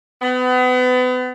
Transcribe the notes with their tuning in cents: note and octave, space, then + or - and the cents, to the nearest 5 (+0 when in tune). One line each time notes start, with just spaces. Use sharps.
B3 +35